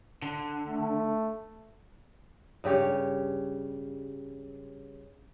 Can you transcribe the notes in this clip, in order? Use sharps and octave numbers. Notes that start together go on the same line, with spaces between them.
D3
A3
G2 C#3 G4 C#5